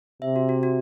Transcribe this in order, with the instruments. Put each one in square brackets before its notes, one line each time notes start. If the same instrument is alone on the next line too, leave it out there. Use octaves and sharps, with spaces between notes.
[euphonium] C3 [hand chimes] E5
[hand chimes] F#4
F#4
F#4